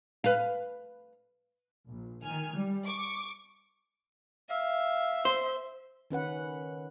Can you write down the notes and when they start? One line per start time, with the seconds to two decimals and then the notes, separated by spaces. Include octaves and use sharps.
0.24 B4 F5
1.86 A#1
2.23 D#3 G#5 F6
2.55 G3
2.85 C#6 D6
4.50 E5 F5
5.25 C5
6.10 D#3 C#4 B4 F#5